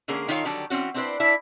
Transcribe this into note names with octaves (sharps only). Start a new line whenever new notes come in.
D3 G#3 A#3 C#4 G#4 A#4
D#3 D#4 F4 A4 C#5 F5
D3 D#3 F#3 G3 D4
E3 C4 C#4 F#4
C4 D4 E4 G#4 B4 C5
D4 E4 E5